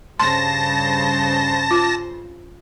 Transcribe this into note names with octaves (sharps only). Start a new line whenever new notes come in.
G2 C#3 C5 A5 C6 A#6
F4